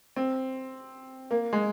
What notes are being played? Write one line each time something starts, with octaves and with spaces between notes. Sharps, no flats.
C4
A#3
G#3